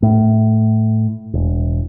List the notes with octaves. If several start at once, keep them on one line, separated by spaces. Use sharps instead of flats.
A2
E1